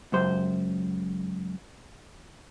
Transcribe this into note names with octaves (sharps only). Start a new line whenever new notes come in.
C#2 F#2 C5